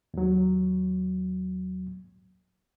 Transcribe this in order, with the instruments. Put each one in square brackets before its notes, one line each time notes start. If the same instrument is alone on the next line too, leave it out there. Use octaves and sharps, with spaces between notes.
[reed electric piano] D#2 F#3